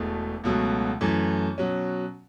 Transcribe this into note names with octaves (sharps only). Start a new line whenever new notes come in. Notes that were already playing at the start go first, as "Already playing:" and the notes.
Already playing: E1 E2 B2 A3
C#2 B2 F#3 A3
F#2 E3 A3
B2 F#3 C#4